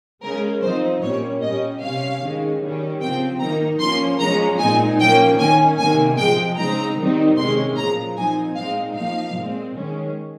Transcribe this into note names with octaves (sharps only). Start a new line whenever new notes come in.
C#3 G#3 C#4 A#4
F3 C4 D#4 C5
A#2 G3 A#3 C#4 C#5
A#2 G3 C#4 D#5
C3 G3 C#4 F5
D#3 G#3 C#4
D#3 G3 C#4
C#3 F3 C4 G5
D#3 A#3 D#4 A#5
F3 A#3 C#4 C6
F3 G#3 C#4 A#5
A#2 G#3 C4 D#4 G#5
F3 A#3 C#4 G5
D#3 A#3 C#4 G#5
C3 D#3 A#3 G#5
C3 F3 G#3 G5
C#3 G#3 C4 D#4 A#5
D#3 G3 C4 D#4
C3 D#3 G#3 C#4 C6
A#2 F3 G#3 A#5
F3 C4 D#4 G#5
A#2 G#3 C4 D#4 F5
F3 A#3 D#4 F5
A#2 G#3 C4
D#3 G#3 C#4